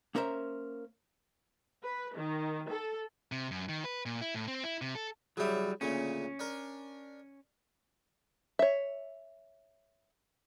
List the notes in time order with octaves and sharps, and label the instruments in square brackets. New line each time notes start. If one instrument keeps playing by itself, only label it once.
[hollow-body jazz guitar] A#3 C#4 A#4 C5 E5
[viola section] B4
D#3
A4
[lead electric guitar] C3
F#2
D#3
B4
A#2
E4
A2
C4
E4
C3
A4
[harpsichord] C#3 E4 [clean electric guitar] F#3 G3
[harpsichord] D2 A#2 C#3 [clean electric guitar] C#4
[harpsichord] D4 A#4
[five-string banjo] C#5 E5